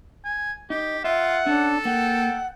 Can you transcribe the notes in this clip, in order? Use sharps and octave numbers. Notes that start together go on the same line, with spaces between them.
G#5
D#4 G4
F4 E5 F#5
C#4 D4 A4
A#3 F#5 G5